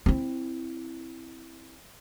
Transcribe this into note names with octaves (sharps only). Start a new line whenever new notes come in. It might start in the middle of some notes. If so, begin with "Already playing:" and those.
C4 E4